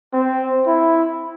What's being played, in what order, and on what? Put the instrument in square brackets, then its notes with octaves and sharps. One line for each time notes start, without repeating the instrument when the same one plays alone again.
[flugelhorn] C4
E4